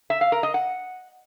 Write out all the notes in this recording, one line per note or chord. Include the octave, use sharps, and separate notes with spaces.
E5
F5
A#4
D#5
F#5